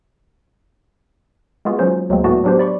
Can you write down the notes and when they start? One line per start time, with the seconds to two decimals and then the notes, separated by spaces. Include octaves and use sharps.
1.65 G#3 A#3 B3 F4 F#4 G#4
1.79 D#3 F#3 C#4 F4 C5
2.09 D2 F#3 G#3 A#3 C4
2.24 A2 A3 B3 F#4 D5 A5
2.44 F#3 B3 D4 G4 C5
2.59 D5 B5 C#6